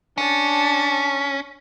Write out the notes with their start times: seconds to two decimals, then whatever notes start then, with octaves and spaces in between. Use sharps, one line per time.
0.18 C#4 D4 A5